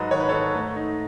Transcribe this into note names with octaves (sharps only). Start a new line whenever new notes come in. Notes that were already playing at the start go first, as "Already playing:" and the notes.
Already playing: G#2 F#3 B4 D#5
D#3 C#5
B4
G#2 A4 C#5
A3
D#4